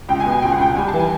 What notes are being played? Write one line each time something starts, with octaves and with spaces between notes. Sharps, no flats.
C#2 G5
G#5
B2
G#5
C#2 G5
F#5
C#2 G5
G3 G#5
A5
E3
G#5